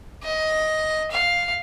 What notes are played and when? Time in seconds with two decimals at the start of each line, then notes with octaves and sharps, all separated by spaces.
0.24 D#5
1.11 F5